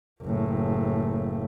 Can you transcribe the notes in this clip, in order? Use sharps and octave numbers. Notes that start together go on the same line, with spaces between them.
F#1 A2